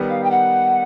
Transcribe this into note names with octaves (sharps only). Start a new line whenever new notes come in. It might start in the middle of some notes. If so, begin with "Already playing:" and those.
Already playing: D#3 G3 B3 D#4 G4
F5
G5
F#5